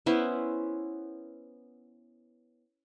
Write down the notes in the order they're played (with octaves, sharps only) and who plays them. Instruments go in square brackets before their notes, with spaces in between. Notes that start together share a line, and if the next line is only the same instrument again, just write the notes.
[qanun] B3 C#4 E4 C5